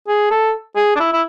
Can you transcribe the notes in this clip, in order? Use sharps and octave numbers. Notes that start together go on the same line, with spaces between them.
G#4
A4
G#4
D4
E4
E4